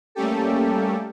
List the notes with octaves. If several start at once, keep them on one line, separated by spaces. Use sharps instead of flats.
G3 A3 A#3 C#4 G4 A4